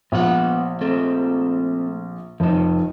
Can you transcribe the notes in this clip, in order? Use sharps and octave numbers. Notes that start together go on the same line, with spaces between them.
A#1 B3 F5 F#5
A3 C4 A4
F1 F3 D#4